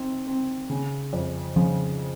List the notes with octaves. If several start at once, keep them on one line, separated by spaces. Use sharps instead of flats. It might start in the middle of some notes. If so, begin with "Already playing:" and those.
Already playing: D#3 C4
C4
C#3
F2
C#3 F3